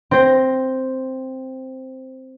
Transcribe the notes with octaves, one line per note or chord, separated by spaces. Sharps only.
C4 C5 A#6